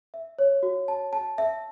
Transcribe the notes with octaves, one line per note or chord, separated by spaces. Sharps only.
E5
C#5
F#4
A5
A5
E5